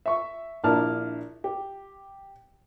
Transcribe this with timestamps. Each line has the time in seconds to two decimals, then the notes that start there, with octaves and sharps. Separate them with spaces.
0.06 E5 C#6
0.64 A#1 D4 E4 A#4 A5 F6
1.44 G4